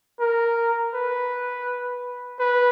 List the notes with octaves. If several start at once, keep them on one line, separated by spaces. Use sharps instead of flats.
A#4
B4
B4